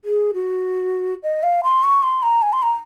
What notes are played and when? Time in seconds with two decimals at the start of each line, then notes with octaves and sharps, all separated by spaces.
0.05 G#4
0.34 F#4
1.23 D#5
1.43 F5
1.64 C6
1.83 C#6
2.03 C6
2.23 A#5
2.42 G#5
2.53 C6
2.63 A#5